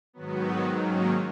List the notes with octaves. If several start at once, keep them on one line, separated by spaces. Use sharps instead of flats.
G#2 D#3 F#3 B3
A#3 C#4